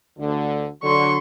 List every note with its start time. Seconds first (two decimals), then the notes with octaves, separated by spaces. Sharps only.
0.18 D2 D3
0.83 D3 F#3 C6 C#6